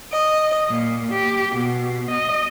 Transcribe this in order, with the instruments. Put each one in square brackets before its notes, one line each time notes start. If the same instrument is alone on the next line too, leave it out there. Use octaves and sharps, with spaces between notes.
[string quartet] D#5
A#2
G4
B2
D#5